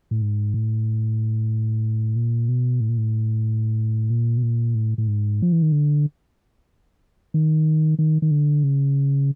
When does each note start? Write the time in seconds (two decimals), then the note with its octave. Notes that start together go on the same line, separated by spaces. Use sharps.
0.11 A2
0.22 G#2
0.54 A2
2.16 A#2
2.48 B2
2.81 A2
2.89 A#2
2.98 A2
4.10 A#2
4.37 B2
4.43 A#2
4.75 A2
4.98 A2
5.08 G#2
5.42 F3
5.52 E3
5.62 D#3
5.72 D3
7.34 D#3
7.99 D#3
8.22 D#3
8.31 D3
8.63 C#3